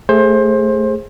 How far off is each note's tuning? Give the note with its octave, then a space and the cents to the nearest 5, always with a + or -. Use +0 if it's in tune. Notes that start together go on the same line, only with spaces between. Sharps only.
A3 +0 G#4 -15 C5 +25